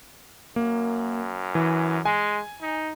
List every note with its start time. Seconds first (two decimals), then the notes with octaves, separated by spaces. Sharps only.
0.56 F#2 A#3
1.55 E3
2.05 G#3 G#5
2.62 D#4